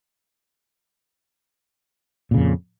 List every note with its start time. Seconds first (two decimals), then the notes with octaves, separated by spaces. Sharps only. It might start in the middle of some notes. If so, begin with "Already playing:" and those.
2.31 A#2
2.34 C#3
2.37 F2